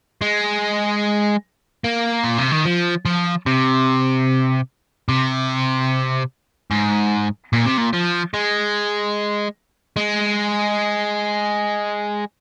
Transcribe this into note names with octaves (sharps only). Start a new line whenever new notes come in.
G#3
A#3
A#2
C3
D#3
F3
F3
C3
C3
G#2
A#2
C3
A#2
F3
G#3
G#3